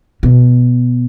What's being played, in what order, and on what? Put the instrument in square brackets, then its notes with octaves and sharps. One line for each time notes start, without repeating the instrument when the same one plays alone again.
[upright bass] B2